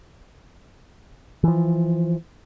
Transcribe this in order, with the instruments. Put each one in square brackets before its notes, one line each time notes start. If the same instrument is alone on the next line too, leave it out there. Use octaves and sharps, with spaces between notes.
[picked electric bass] E3 F3